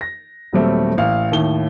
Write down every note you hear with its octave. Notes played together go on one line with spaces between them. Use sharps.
A#6
D#1 F#3 G3 A3 C4
A1 F5
D#2 A2 G7